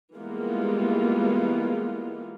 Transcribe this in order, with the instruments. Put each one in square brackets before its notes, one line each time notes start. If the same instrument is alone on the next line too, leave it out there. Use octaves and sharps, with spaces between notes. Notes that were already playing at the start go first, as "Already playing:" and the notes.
[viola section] E3 G3 G#3 A#3 B3 F4